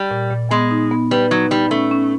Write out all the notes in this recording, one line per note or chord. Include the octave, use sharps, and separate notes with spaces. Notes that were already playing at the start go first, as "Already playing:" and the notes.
Already playing: G3
A#2
A#2
G#3 B3
D#4
B3
G3 B4
F#3 D#4
G3 D#4
A3 C#4
C#4